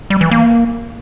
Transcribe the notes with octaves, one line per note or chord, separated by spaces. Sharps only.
G3
E3
A#3